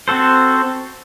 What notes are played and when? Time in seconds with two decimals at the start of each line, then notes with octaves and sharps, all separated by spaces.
0.08 C4 F#4 A4 C5